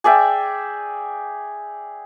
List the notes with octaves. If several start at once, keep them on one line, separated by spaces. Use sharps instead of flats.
G#4 D5 E5 G5